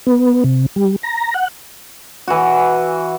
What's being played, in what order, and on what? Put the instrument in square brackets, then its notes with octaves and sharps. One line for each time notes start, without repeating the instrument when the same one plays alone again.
[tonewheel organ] B3
C3
G3
A#5
F#5
[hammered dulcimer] E3 F#4